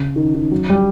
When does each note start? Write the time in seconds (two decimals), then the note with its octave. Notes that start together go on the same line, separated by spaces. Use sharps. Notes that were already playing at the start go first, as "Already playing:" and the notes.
Already playing: C#3
0.16 D#3
0.35 D#3
0.51 F#3
0.70 G3